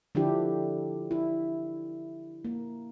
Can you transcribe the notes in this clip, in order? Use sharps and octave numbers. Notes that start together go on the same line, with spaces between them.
D3 F3 D4 E4 G4
E4
A#3